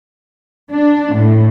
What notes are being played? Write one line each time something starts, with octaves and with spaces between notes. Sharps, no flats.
D4
A2